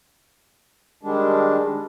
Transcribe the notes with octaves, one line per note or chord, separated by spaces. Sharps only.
D#3 G3 G#3 D4